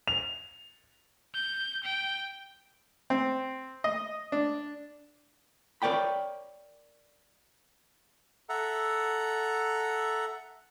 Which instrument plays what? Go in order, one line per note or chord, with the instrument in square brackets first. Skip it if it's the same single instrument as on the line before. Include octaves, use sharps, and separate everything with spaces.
[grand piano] F7
[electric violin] G6
G5
[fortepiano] C4
D#5
D4
[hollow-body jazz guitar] A#4 C#5 D5 G5 B5
[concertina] A4 E5 F#5 A#5